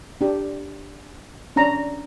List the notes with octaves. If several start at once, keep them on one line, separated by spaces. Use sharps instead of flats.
D4 G4
C#4 D4 C#5 A#5